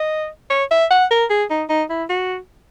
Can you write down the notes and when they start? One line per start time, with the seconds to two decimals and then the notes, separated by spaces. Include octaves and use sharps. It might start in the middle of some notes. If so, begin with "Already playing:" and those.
Already playing: D#5
0.50 C#5
0.71 E5
0.90 F#5
1.11 A#4
1.30 G#4
1.50 D#4
1.69 D#4
1.90 E4
2.09 F#4